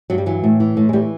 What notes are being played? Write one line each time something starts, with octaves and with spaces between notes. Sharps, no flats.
G2 F#3
G3
E3 F#3
A2
E3
A2
G#3
E3 G3